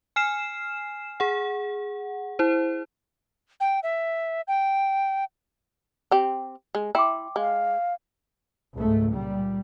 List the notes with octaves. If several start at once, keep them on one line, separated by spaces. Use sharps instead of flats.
G#5 F6 C7 E7
G#4 F#5
E4 C5
G5
E5
G5
C4 G4
G#3
E4 G5 C6 D6
G#3 F5
C#2 G#2 A3
A#2 G3